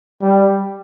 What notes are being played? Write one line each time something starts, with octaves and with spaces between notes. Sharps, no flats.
G3